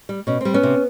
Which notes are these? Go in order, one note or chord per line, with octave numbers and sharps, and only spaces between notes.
G3
B2 C#4
G3 C4
B3 C#4
C3